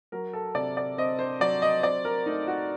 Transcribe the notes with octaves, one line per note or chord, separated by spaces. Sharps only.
F#3 A#4
A4
C3 D5
D5
C4 D#5
C5
F#3 D5
D#5
C4 D5
A#4
A3 D#4
F#4